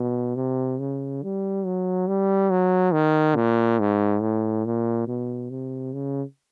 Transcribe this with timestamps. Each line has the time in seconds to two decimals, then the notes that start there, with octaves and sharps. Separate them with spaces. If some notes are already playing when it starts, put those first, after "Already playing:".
Already playing: B2
0.36 C3
0.80 C#3
1.23 G3
1.65 F#3
2.08 G3
2.50 F#3
2.93 D#3
3.36 A#2
3.79 G#2
4.22 A2
4.65 A#2
5.07 B2
5.50 C3
5.93 C#3